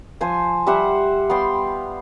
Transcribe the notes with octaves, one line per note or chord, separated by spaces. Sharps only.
F3 C5 G#5
G3 C5 E5 F#5
B3 F5 G5 C6